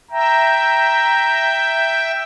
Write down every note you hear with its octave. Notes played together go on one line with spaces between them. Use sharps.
E5 G5 A#5